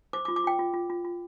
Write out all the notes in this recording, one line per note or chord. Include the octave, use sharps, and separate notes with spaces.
C5 D6
D6
F4
D6
F4 G5
F4
F4
F4
F4